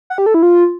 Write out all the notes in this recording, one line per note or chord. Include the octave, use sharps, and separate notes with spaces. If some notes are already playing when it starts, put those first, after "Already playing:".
F#5
G4
A4
E4
F4